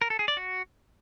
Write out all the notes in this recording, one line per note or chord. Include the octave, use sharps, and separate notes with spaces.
A#4
A4
G#4
D5
F#4